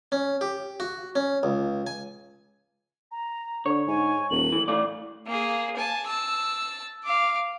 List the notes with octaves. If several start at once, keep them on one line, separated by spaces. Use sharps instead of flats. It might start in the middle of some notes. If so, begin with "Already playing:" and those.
C#4
G4
F#4
C#4
C#2
G#5
A#5
D3 C#5
G#2 G#5
D#1 F#7
A2 E3
E3 A3 D5 F5
A#3 G#4
G#5 A5
A5 E6
F5 D6